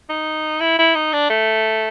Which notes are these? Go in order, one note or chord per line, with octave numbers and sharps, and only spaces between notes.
D#4
E4
E4
D#4
D4
A3